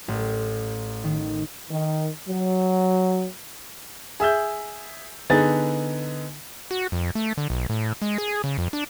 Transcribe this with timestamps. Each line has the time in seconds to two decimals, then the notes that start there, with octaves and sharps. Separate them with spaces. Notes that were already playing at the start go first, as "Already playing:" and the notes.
0.08 A1
1.04 D#3
1.71 D#3
2.28 F#3
4.20 G#4 E5 E6 G6
5.30 D3 B3 D#4 G#4 A6
6.71 F#4
6.92 F2
7.15 A3
7.37 D3
7.50 B1
7.70 A2
8.02 G#3
8.18 G#4
8.44 C#3
8.58 F2
8.73 D4